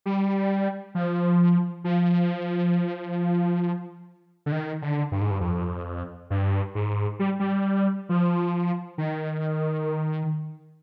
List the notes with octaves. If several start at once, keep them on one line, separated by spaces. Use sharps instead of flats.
G3
F3
F3
D3
D#3
D3
G2
G#2
G2
F2
G2
G#2
G3
G3
F3
D#3